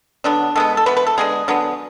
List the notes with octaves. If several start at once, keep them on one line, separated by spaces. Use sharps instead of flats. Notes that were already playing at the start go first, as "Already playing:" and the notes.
D3 F#3 B3 D4
B2 G#3 B3 A4
A4
E3 B3 B4
B4
A4
D3 G#3 B3 G#4
D3 F#3 B3